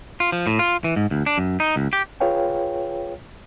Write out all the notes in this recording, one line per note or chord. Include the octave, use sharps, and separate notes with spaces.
F4
F3
A2
F4
E3
G#2
D2
D4
F#2
D#4
C#2
G4
F4 G#4 B4 C#5 F5 G5